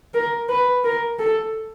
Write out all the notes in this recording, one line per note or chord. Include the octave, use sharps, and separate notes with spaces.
A#4
B4
A#4
A4